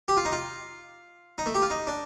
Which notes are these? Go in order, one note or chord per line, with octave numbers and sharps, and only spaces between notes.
G4
F4
D#4
F4
D#4
A3
G4
F4
D#4
D4